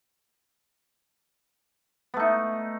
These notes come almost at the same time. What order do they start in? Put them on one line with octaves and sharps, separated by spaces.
B3 A3 D#4